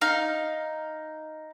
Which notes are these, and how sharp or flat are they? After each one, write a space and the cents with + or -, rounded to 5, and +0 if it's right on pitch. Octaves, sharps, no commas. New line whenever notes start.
D#4 +0 F5 +5